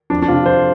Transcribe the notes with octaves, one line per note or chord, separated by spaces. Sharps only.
F2 D4
D4
C3 F3 F4
F2 C5